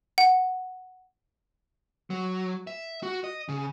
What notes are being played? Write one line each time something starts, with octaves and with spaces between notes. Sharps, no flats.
F#5
F#3
E5
F#4
D#5
C#3